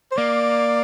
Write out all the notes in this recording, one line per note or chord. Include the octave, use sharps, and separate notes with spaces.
C5
A#3 D5